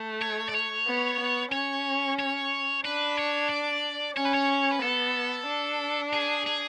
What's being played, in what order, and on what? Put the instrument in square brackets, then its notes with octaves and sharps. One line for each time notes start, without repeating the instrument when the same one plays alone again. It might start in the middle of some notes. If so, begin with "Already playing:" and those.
Already playing: [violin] A3
[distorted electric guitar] C#5
D5
C#5
[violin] B3
B3
[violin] C#4 [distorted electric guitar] C#5
[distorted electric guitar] C#5
[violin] D4 [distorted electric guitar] B4
[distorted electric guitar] C#5
D5
[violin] C#4 [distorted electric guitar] C#5
[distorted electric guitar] B4
C#5
B4
[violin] B3 [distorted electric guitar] A4
[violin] D4
[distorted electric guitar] G#4
G#4